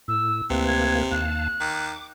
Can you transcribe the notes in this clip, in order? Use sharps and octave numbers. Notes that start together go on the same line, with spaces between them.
A2 E6
D2 C3 A#3 B4
G#6
D#2 F5 A5 F#6
D#3 D6